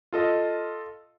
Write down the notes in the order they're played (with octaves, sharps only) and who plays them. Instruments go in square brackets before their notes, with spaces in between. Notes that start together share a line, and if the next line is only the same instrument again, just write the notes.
[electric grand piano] F4 A4 D#5